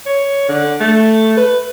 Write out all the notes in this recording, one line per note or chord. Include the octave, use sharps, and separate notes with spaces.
C#5
D3
A3
B4